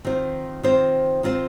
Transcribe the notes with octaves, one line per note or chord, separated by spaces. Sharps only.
D#3 C4 F4 C5
D#3 C4 F4 C5
D#3 C4 F4 C5